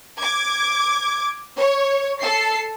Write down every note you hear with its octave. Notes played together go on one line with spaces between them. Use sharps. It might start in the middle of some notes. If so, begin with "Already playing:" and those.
D6 G#6
C#5
A4 C7